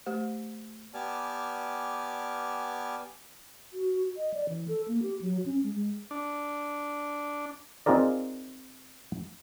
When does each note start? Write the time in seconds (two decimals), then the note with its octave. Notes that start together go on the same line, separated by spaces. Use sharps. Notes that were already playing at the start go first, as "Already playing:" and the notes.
0.06 A3 G4 C5
0.94 B3 G4 D5 G#5 A5 F6
3.73 F#4
4.17 D#5
4.34 D5
4.49 E3
4.68 A4
4.88 A#3
5.03 G4
5.22 F#3
5.46 C#4
5.63 G#3
5.75 G#3
6.11 D4
7.86 C4 D#4 F4 G#4 A#4 D5